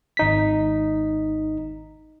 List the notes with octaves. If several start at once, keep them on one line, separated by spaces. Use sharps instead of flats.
G#1 D#4 B6